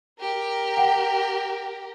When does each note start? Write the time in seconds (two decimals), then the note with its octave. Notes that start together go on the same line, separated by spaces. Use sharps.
0.20 G4 A#4
0.77 F#5 G5